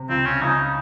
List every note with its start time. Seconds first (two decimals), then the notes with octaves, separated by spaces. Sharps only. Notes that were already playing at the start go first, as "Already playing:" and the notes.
Already playing: C3
0.09 C#2 C4
0.26 C#4
0.42 C#2 D#4